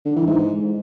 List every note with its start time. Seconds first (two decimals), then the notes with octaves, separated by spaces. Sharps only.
0.05 D3
0.16 E3
0.27 G#2